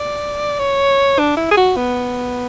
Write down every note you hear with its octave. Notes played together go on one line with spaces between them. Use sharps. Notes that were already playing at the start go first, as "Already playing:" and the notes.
Already playing: D5
C#5
D4
E4
G#4
F#4
B3